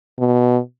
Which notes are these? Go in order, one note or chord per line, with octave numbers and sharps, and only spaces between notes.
B2